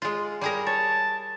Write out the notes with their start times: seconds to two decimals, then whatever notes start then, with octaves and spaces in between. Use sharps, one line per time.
0.02 G#3 F4
0.41 G3 G#4 A#4
0.67 C#5 A5